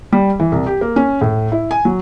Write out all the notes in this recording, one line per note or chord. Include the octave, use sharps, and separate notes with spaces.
G3
E3
C2
G4
A#3
C#4
A2
E4
G#5
F#3